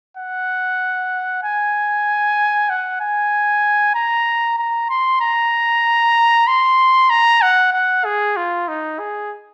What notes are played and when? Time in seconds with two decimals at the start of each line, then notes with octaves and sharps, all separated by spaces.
0.17 F#5
1.43 G#5
2.70 F#5
3.01 G#5
3.95 A#5
4.58 A#5
4.90 C6
5.21 A#5
6.47 C6
7.10 A#5
7.42 F#5
7.73 F#5
8.05 G#4
8.37 F4
8.68 D#4
8.99 G#4